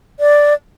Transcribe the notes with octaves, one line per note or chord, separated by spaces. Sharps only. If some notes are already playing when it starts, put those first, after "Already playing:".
D5